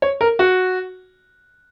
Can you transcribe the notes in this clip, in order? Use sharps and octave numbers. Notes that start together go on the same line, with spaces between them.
C#5
A#4
F#4